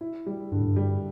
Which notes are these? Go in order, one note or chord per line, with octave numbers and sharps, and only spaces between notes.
E4
G3
G2 D3
A2
G2
G3